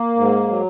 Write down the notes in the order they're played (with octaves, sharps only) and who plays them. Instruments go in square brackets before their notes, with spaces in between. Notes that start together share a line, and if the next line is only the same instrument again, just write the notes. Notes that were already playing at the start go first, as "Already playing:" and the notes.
Already playing: [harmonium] A#3
G#2
F#3